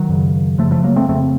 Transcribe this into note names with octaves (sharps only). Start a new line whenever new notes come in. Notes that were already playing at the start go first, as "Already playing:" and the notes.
Already playing: D#3 F#3
F#2 C#3
F#2 C#3 F3 A3
F3 A3
F#3 A#3
A3 C4
F2 C#3 A3 C4